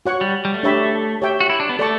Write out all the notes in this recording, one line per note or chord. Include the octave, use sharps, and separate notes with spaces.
F#4 C#5 F#5 C#6
G3
G3
A3
D4 G4 C#5 E5 B5
G4 C#5 E5 G5
F#4
E4
D4
B3
A3 A4 D5 A5 C#6